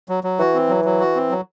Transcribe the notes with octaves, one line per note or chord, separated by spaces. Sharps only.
F#3
F#3
E3 F#4
C4
F#3
F#3
F#4
C4
F#3